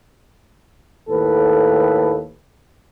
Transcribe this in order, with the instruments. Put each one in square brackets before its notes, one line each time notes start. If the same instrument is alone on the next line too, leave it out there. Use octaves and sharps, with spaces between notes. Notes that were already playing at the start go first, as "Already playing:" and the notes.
[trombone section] D#2 A2 A4 B4